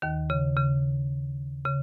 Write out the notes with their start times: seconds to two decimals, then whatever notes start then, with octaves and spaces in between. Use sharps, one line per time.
0.02 D#2 D#3
0.30 C#3
0.57 C#3
1.65 C#3